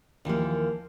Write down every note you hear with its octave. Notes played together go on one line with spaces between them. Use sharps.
D#2 E3 F3 A#3